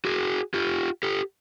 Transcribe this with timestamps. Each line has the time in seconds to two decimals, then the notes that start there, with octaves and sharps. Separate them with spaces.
0.05 F#4 G#4
0.54 F4 G4
1.03 G4 A4